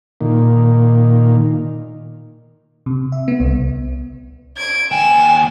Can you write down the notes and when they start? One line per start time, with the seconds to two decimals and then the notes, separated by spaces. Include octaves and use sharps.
0.21 A#2 D#3
2.86 C3
3.12 E5
3.28 B3
3.40 C2
4.57 G#6 D7
4.92 D#2 G5 G#5 E7